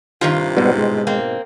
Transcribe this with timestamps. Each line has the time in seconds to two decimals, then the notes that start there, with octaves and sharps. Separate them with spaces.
0.21 G2 C3 D#3 F4
0.57 G#2 B2 G3 B3
0.77 G#3
1.07 A#3 C4